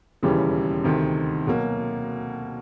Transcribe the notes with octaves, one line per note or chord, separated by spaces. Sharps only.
E1 D#2 C#3 E3 G3
D2 C3 D#3
B2 F#3 A#3